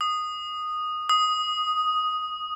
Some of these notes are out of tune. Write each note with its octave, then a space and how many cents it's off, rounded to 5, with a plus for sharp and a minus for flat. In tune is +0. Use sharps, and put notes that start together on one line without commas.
D#6 -10
D#6 +5